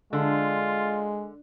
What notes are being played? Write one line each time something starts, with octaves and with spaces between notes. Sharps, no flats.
D3 G#3 F4